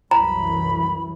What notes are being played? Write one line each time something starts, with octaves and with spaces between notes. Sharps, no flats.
C2 F#2 E3 A#5 B5